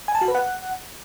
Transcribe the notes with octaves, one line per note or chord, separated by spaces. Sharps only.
G#5
A5
F#4
B4
F#5